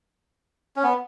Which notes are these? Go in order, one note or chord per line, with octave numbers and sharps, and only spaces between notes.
C#4
B3